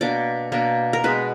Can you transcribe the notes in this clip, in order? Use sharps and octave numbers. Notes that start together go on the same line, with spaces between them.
B2 A#3 D4 D5
B2 A#3 D4
A#4
B2 G#3 B3 B4